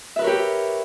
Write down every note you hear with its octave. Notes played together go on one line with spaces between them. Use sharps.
G4 A#4 B4 C#5 E5